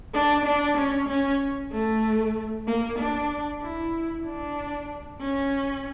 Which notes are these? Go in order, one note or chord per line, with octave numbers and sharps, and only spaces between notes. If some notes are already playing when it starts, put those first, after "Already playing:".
D4
D4
C#4
C#4
A3
A#3
D4
E4
D4
C#4